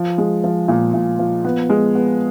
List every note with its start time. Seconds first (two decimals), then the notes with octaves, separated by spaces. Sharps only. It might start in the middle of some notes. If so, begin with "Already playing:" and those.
Already playing: F3
0.18 G#3
0.44 F3
0.68 A#2
0.94 A#2
1.19 F3
1.45 B3
1.70 G#3
1.95 B3